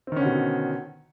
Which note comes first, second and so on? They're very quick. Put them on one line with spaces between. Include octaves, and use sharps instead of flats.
C4 D#3 C#4 D3 B2